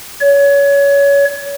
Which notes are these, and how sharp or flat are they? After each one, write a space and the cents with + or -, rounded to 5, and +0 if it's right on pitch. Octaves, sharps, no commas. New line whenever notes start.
C#5 +25